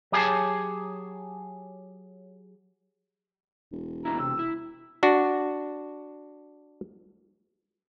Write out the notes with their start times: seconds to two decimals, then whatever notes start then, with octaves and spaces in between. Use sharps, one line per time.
0.12 F#3 G4 G#4 C#5 A5
3.72 E1
4.05 A#2 D4 E4 A#5
4.19 C3 E6
4.39 E4
5.03 D4 F#4